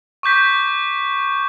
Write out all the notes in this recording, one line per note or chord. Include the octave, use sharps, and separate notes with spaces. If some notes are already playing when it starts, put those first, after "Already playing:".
C#6 D6 G6 B6